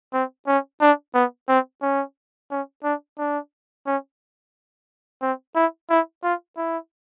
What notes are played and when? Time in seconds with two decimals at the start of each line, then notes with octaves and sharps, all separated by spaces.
0.13 C4
0.47 C#4
0.81 D4
1.14 B3
1.49 C4
1.82 C#4
2.51 C#4
2.84 D4
3.18 D4
3.86 C#4
5.22 C4
5.55 E4
5.90 E4
6.23 F4
6.57 E4